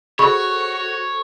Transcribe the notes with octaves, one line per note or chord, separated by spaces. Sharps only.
F#4 G#4 A4 C5 C#5 B5 C#6